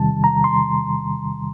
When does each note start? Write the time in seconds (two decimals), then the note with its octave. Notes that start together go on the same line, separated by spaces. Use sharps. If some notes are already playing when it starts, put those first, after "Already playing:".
Already playing: E2 C3 D#3 G3 A5
0.24 A#5
0.44 C6